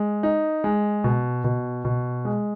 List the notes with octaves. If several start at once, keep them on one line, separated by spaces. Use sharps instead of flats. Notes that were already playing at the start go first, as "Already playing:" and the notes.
Already playing: G#3
D#4
G#3
B2
B2
B2
G#3